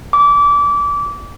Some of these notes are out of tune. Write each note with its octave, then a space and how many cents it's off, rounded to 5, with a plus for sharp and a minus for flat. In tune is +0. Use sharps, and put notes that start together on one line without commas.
D6 -25